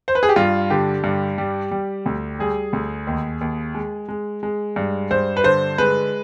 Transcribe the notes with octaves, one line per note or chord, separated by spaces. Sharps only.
C5
B4
G#4
G4
G2 F4
D3 G4
G2
G3
G3
D2
G3 G#4
D2
D#2
D#2
G#3
G#3
G#3
G2
G2 C5
B4
D3 C5
G#3 B4